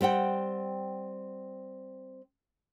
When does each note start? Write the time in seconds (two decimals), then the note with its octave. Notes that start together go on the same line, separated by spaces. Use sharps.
0.01 G3 C4 F#5 G5